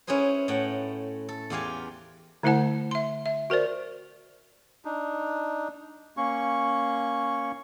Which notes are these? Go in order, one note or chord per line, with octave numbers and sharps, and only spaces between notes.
C#4 E4 G#4 B4 C5
A2 A3 F#5 G5
A4
E2 F4 G4 F5 G#5
D3 A3 E4 C5 F#5 A5
E5 C6
E5
F#4 A#4 C5 D5
D4 D#4
A#3 C#4 C#6